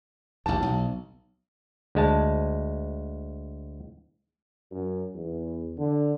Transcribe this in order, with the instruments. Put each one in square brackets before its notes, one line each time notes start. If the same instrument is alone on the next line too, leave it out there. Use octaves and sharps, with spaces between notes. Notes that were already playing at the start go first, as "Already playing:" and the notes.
[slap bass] A1 D#2 [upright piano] A5
[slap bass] B1
[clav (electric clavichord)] D2 G#3 A5
[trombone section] F#2
E2
D3